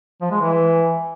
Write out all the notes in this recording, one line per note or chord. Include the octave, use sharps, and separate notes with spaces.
F3
G#3
E3